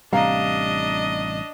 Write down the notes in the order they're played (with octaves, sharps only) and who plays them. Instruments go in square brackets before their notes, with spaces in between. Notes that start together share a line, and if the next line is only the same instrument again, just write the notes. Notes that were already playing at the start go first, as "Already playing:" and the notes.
[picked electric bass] A1 C3 G3 [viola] D4 D#5 [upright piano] F5 A#5